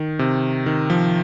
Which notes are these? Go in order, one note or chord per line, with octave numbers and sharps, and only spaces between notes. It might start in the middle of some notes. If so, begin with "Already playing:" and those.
Already playing: D#3
C3
D#3
F3